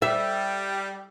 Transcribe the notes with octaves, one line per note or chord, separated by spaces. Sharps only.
G3 E5